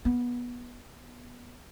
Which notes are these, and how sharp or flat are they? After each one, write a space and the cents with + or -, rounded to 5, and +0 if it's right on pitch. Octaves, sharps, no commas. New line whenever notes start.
B3 -20